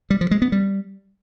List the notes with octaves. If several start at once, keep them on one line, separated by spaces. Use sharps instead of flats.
G3
F3
G#3
B3
G3